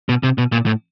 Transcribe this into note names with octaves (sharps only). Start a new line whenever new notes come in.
B2
C3
B2
A#2
A2